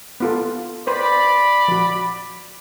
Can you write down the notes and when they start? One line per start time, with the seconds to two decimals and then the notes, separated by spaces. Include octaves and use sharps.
0.20 B3 F4 A4
0.87 B4 C5 D5 B5
1.68 F3 F#4